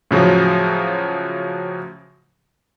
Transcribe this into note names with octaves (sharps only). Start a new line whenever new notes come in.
A2 C#3 F3 F#3